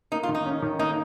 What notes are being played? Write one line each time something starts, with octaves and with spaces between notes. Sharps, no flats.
A#3 D#4
F4
D#3
D#4
C#4
D#3
A#3 D#4